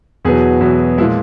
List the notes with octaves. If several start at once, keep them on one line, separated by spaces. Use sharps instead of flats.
E2 B2 F#3 B3 G#4
E2 B2 F#3 B3
A#2 F3 G#3 E4